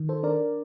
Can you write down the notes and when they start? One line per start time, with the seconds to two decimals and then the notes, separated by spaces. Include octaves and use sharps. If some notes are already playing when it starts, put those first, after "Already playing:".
Already playing: D#3
0.09 A4 C5
0.23 D4 A#4 D5